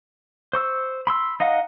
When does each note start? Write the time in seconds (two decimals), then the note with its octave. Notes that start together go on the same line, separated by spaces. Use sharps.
0.53 C5 C#6 E6
1.07 B5 C6 E6
1.40 D#4 D#5 F5 F#5